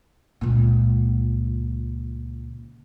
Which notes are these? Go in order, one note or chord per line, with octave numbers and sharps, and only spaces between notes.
C#2 A#2